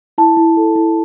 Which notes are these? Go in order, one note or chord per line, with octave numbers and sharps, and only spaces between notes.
E4 A5
E4
A4
E4